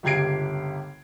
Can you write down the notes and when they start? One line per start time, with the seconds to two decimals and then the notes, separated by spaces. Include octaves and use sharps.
0.03 G1 C#2 G4 G#6 C7 D7